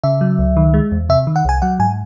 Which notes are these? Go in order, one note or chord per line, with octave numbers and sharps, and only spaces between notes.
C#3 E5
F#3
C#2
D#3
G#3
E2
C3 E5
D#3
F#5
C2 G#5
F#3 F#5
G#2 G#5